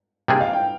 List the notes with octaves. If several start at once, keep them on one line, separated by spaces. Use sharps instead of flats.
C3 G3 A#3 D4 G#4 G5
F5
G5